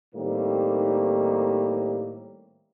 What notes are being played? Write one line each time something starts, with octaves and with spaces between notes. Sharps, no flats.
A2 D#3 G3 A#3 C4 D#4